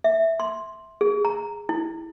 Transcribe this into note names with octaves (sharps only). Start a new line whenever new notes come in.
E5
C6
G#4
A#5
E4